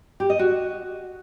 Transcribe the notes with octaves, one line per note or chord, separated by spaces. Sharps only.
G4
D#5
F#4